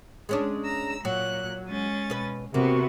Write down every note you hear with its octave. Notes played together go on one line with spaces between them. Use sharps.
G#3 C#4 D4
A#5 E6
A#2 F#3 F#6
G#3 C#4 A6
B2 B4
C3 A#3 B3 F#4